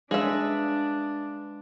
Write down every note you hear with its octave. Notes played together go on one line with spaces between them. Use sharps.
G#3 D4 G#4 B4 E5 F5 D#6